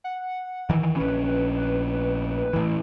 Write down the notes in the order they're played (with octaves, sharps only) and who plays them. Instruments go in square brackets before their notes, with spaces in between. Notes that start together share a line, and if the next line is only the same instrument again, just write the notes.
[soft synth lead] F#5
[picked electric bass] D#3 E3
[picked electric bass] A#1 C#4 [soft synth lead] B4
[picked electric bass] A2 E3